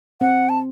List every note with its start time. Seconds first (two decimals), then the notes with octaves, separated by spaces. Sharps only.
0.21 C4 F#5
0.49 A5